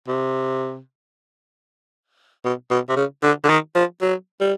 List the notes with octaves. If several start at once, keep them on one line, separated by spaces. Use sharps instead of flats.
C3
B2
B2
C3
C#3
D3
D3
D#3
F3
F#3
G3